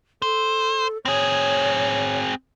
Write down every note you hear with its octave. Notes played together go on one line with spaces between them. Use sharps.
A4 C5
C4 G#4 C#5